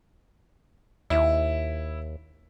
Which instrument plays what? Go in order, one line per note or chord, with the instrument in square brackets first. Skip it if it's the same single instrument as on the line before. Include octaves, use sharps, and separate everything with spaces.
[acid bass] D#2 [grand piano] E4